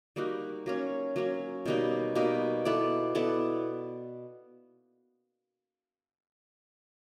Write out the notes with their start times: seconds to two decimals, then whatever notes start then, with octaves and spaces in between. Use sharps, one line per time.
0.16 G3 A#3 D#4 F#4
0.66 F#3 A#3 C#4
1.16 F#3 A#3 C#4
1.66 B2 G3 A#3 D#4
2.15 B2 G3 A#3 D#4
2.65 B3 E4 A4 D5
3.15 B3 E4 A4 D5